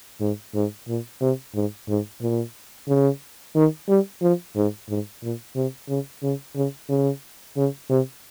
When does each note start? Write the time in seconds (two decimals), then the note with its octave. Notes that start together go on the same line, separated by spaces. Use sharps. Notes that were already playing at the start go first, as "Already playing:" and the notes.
0.21 G#2
0.55 G#2
0.88 A#2
1.21 C3
1.55 G#2
1.89 G#2
2.21 A#2
2.88 C#3
3.55 D#3
3.89 G3
4.22 F3
4.56 G#2
4.89 G#2
5.23 A#2
5.56 C3
5.89 C#3
6.23 C#3
6.55 C#3
6.89 C#3
7.56 C#3
7.90 C3